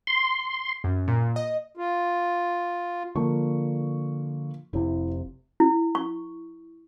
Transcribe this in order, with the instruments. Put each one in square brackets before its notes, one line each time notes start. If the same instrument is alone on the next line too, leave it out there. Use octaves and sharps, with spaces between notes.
[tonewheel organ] C6
[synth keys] F#2
A#2
D#5
[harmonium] F4
[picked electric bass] D3 [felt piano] F3 A#3 C#6
[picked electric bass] F1 C3 [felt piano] E4
[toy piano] E4
C#6